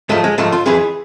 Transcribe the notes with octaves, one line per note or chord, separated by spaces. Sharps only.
G#2 F3 A3
G#3
G#2 F3 A3
F4
F2 E3 G#4